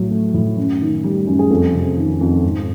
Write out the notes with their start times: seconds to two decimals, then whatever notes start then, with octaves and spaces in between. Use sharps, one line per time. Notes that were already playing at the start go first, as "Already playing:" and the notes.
Already playing: A2 F#3
0.11 A3
0.34 A2
0.57 F#2
0.81 D#3
1.04 G3
1.27 F#2
1.39 G#4
1.50 F2 A4
1.74 C3
1.97 D#3
2.21 F2
2.44 G#2